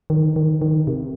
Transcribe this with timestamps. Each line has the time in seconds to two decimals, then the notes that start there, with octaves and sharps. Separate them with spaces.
0.10 D#3
0.36 D#3
0.62 D#3
0.87 C3